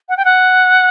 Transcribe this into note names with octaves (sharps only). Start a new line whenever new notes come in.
F#5
G5
F#5